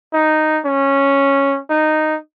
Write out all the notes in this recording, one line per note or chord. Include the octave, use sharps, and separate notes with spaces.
D#4
C#4
D#4